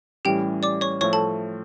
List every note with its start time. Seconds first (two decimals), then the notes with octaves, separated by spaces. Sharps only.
0.25 A2 E3 G3 C#4 G4 G5
0.63 D5 D6
0.81 C#5 C#6
1.01 A2 F3 A3 C#5 C#6
1.13 A4 A5